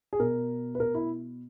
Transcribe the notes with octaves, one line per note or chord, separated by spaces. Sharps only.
G#4
B2 A#4
B4
A#4
E4